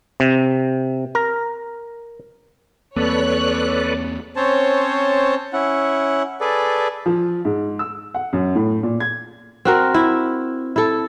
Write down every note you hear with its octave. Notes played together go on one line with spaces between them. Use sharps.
C3
A#4
E2 A#3 C4 A4 B4 C#5 D5 F#6
C4 C#4 C5 C#5 A5
C#4 E4 F#5
G#4 A4 B4 D5
F3
G#2
E6
F#5
F#2
A2
A#2
G#6
C4 F#4 A#4
E4
E4 A4